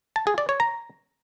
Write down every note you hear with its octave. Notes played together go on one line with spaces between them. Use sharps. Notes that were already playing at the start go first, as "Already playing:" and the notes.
A5
G#4
D5
C#5
A#5